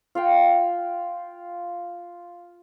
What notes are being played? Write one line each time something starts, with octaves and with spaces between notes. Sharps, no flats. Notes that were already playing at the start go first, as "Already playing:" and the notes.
F4 F5 G5